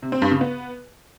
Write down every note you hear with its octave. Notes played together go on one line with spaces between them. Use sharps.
C3
C4
G2
C#3
B3